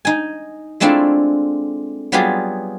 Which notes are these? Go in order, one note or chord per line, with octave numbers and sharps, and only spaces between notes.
D#4 G#5
G#3 A3 C4 D4 E4 F4
F#3 G3 B3 F4 G4 G#4